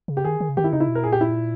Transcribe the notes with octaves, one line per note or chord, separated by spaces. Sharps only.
C#3
G4
D#3 G#4
D#3
C#3
D#3 G4
E4
C#3 D#4
E4
B2
A#4
A#2 G#4
G4
E4